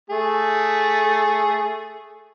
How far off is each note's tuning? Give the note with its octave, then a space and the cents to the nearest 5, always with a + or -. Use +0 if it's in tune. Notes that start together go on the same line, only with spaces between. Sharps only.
A3 +0 G#4 +0